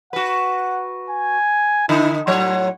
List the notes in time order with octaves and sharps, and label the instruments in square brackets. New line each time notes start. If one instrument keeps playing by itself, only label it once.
[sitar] F#4 B4 [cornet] F#5
[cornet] G#5
[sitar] D3 D#4 [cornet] E4
[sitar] A2 F#3 C#5 [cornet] F#5